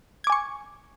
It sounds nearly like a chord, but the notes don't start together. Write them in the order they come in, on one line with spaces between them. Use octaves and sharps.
G#6 D6 G#5 C#6